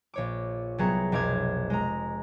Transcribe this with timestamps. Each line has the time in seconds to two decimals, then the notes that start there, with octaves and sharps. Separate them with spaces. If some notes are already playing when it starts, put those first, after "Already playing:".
0.14 A#1 C#5 D6
0.78 C2 F#3 B3 G#4 A#5 C#7
1.12 F1 B1 D6 F6 G#6
1.70 G#3 A#5